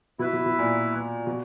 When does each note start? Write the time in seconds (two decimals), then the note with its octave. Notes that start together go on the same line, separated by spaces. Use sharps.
0.19 B2 E4 B4 E5
0.33 B2
0.46 B2
0.59 A#2
1.27 B2